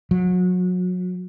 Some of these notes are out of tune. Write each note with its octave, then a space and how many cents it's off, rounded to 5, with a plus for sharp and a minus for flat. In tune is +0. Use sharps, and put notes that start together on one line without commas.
F#3 -30